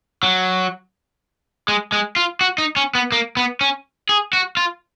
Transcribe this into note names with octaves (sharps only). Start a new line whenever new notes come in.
F#3
G#3
G#3
F4
F#4
D#4
C#4
B3
A#3
B3
C#4
G#4
F#4
F4